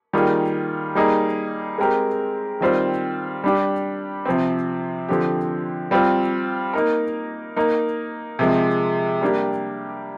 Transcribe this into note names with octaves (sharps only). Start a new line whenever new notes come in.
D#3 G3 A#3 F4 G#4
G3 A#3 D#4 G#4
G#3 C4 G4 A#4
D#3 G3 C4 F4 C5
G3 D4 G4
C3 F3 C4
D3 F3 C4 G4
G3 C4 F4
A#3 D#4 A#4
A#3 D#4 A#4
C3 F3 G#3
G3 A#3 D4 G4